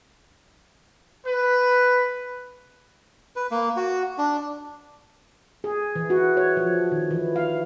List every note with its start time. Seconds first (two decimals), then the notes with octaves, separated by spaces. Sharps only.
1.26 B4
3.36 B4
3.51 A#3
3.77 F#4
4.18 D4
5.64 G#4
5.95 E3
6.10 F#4
6.37 C#5
6.57 F3
6.92 D#3
7.11 E3
7.36 F5